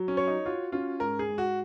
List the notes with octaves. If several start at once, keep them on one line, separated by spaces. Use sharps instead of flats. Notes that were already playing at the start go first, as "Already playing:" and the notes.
Already playing: F#3
C#4
C#5
D#4
F4 F#4
C#4 F4
G#2 A#4
G#4
G#2
F#4